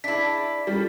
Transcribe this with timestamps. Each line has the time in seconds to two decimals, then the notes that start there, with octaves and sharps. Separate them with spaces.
0.04 D4 E4 G#4 E5 B6
0.67 G3 C#4 F4 A4